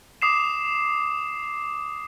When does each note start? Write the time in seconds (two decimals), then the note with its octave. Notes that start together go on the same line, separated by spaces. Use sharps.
0.22 D6 D#6 C7 E7